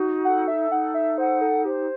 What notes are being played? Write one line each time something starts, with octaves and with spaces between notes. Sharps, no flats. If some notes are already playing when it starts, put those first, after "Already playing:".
Already playing: D#4 F#4
A4 F#5
E5
D#4 F#5
E5
C5 F#5
A4
G4 C5